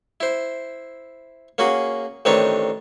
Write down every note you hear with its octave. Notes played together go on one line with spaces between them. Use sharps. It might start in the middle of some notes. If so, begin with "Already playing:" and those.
E4 C5
A#3 C#4 F#4 G#4
A1 D#3 C4 D4 B4 C#5